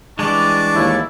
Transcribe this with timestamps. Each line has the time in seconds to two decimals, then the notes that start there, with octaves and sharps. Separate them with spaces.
0.19 E3 G3 G#3 D4 A5 C#6 D6
0.75 D#2 E4